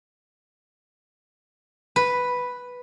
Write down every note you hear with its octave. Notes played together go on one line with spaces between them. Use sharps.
B4